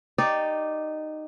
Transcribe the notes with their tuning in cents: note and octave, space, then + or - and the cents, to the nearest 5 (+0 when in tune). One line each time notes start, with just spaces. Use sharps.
D#4 -10 G4 +0 D5 +0